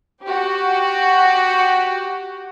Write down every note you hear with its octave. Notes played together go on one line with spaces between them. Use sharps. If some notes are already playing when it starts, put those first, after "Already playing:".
F#4 G4